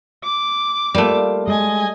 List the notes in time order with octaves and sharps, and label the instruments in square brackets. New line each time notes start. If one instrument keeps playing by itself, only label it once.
[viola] D6
[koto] G3 A3 [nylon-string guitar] A#3 F4
[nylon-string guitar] G#3 [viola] D#5 G#5